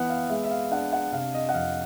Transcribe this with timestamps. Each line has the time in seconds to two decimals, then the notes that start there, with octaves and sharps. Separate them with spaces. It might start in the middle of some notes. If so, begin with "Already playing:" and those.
Already playing: E3 B3 F#5
0.10 F5
0.30 G#3 E5
0.44 E5
0.51 F5
0.71 D4 F#5
0.93 F#5
1.12 C3 F5
1.34 D#5
1.49 F#5
1.54 F2 F5